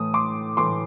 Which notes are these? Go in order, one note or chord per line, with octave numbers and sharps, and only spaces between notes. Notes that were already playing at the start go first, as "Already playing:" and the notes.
Already playing: A2 E3 A3 D#6
C6 D6
A2 E3 A3 C6 D6